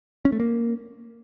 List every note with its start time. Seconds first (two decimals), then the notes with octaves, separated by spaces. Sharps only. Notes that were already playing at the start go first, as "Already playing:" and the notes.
0.25 C#4
0.32 A3
0.40 A#3